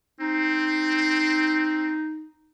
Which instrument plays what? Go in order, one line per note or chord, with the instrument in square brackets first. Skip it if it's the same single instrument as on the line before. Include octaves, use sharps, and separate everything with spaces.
[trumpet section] C4 [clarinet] D#4